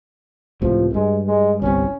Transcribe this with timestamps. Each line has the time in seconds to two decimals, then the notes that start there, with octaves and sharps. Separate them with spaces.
0.62 C#2 A2 C3 F3
0.94 G2 G#3
1.27 G#3
1.62 G1 C2 C3 C#4